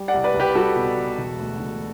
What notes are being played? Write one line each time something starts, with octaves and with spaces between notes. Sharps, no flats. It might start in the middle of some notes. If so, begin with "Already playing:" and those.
Already playing: G3
D5 F#5
C2
B4 D5
C2
G4 B4
G3 F#4 A4
B2
B2
E1
D2
E1